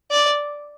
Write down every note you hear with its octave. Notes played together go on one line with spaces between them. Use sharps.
D5